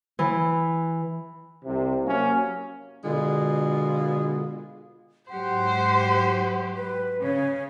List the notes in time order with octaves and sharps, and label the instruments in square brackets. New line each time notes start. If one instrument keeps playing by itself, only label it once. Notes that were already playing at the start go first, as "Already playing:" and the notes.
[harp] E3
[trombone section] C2 C3
F#3 A#3 C#4
[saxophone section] B2 D3 G#3 F4
[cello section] G#2 F#3 G4 [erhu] C5 [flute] F#5
[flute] B4
[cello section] C#3 C#4 [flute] C#5